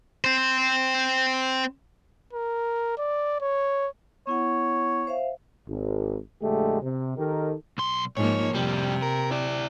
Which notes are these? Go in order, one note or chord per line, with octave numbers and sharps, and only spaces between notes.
C4 C5
A#4
D5
C#5
B3 E4 C#5 F#5
C5 E5 F5
G#1
A#1 D3 G#3 A3 G4
C3
D#3 D#4 G4 A4 A#4
B1 C6
G#2 F3 A#3 C#5
F2 C3 G3
A#4
E4 D5